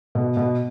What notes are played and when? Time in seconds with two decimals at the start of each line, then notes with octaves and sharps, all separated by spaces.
0.15 B2
0.37 B2